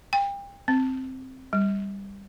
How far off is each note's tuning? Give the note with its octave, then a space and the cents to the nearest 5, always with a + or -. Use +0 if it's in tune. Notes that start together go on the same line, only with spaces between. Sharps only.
G5 +30
C4 +0
G3 +15